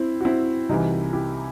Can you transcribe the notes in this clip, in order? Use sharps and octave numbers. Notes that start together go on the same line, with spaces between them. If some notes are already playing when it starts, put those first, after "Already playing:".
Already playing: C4 E4
F#4
C4 E4
C2 C3 E3 D#4 F#4
E4 G4